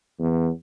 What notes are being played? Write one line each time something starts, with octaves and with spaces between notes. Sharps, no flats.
E2